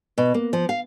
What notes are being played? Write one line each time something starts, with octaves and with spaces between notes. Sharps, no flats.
B2
A#3
F3
F5